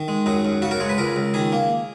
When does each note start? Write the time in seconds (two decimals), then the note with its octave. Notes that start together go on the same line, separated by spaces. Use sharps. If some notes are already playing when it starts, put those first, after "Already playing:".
Already playing: D#3
0.08 G#3
0.26 F#2 D#4
0.45 F#2
0.62 C#3 F#4
0.71 A#4
0.80 G#3 C#5
0.89 B4
0.98 C#2 A#4
1.16 C#2
1.34 D#3 G#4
1.52 A#3